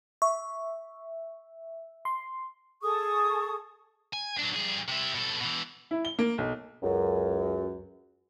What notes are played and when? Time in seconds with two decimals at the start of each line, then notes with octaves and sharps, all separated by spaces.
0.22 E5 C#6
2.05 C6
2.82 G#4 A4 C#6 D#6
4.13 G#5
4.37 F#3 D4
4.54 G2 G#4
4.88 C3 E4
5.14 B2 A4
5.41 B2 E3
5.91 E4
6.05 G7
6.19 A#3
6.38 B1
6.83 C#2 F#2